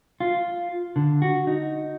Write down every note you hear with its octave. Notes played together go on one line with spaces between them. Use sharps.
F4
D3
F#4
D#4